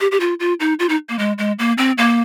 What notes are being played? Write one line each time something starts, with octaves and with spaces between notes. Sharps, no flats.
G4
G4
F4
F4
D#4
F4
D#4
A#3
G#3
G#3
A#3
C4
A#3